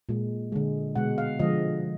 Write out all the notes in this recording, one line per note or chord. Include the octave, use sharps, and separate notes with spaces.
A#2 G#3
D3 G#3
B2 G#3 F#5
F5
D3 F3 G#3 D#5